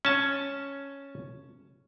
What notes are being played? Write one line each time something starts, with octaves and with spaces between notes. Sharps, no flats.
C#4 A5